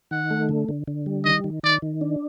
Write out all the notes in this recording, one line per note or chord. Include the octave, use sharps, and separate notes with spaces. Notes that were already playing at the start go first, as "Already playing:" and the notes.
D#3 F#5
A3
D3
D3
D3
G3
D#3 D#5
D#3
D#3 D5
D#3
D4